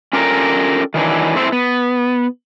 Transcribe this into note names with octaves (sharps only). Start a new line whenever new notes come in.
C#4 D4 F4 G4 A4 A#4
D#3 E3 F#3 D4
A3 C4 E4 C5
B3